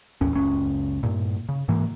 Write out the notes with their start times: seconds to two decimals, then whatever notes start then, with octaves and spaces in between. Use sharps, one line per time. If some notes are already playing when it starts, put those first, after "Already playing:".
0.21 A1 D#2 C#4
0.33 F#1 C#2 C#4
1.03 G2 A#2
1.49 C#3
1.68 G#2 E3 A#3